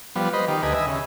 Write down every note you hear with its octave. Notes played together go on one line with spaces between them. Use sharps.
F3 G3 B3
B4 C5 D#5
D#3 G4
D2 B4 D#5 G#5
D#5 E5 G#5
C#3